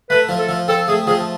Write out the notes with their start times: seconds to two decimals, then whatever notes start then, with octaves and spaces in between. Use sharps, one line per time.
0.10 A3 B4
0.29 F3
0.39 A4
0.49 F3
0.68 C4 A4
0.88 A3 G#4
1.07 F3 G#4